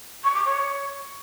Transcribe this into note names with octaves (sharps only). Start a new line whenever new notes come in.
C#6
D6
C#5